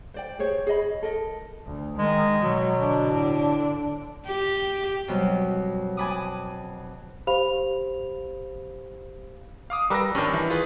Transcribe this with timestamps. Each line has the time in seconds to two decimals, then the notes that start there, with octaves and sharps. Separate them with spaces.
0.14 C5 D5 G5
0.39 G4 G#4 C5 C#5
0.67 G#4 C#5 D#5 B5
1.03 A4 A#4 D#5
1.66 D2
1.98 D#3 G#3
2.43 B2 F#3
2.79 D3 D4
3.11 A2
4.27 G4
5.08 F2 B2 F#3 G3
5.97 G#5 A5 B5 D6 D#6
7.27 G4 C5 F5 B5 F7
9.70 F5 D6 D#6
9.90 G3 A#4 B4 D6 E6 A#6
10.15 G2 D#3 C#4 D4
10.34 E3
10.50 F4 G#4 B4